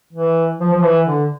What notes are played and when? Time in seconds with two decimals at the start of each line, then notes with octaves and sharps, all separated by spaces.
0.13 E3
0.60 F3
0.73 F3
0.83 E3
1.06 D3